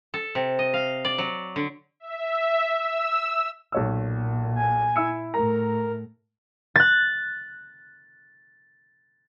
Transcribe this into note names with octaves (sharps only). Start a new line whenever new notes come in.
A4
C3
D#5
F5
D5
F#3
D3
E5
E6
B1 A#2 C#5 E6
G#5
E4 E6 C#7
A2 A3 A#4 A#5
F#6 A6